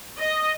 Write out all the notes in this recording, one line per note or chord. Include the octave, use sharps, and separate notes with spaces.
D#5